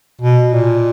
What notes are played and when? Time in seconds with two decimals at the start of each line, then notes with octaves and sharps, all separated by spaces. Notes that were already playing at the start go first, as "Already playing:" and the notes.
0.21 B2
0.53 A#2